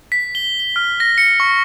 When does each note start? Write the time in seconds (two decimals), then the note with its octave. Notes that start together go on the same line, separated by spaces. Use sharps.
0.12 B6
0.35 G7
0.60 G7
0.76 F6
1.00 A#6
1.18 C#7
1.40 C#6